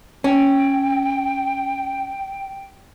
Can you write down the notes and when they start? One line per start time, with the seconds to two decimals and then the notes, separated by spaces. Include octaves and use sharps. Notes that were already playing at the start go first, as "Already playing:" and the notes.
0.24 C#4 G5